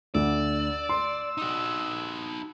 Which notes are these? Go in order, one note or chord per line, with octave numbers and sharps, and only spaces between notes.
D2 D3 D5 E6
C6
D#4 F#4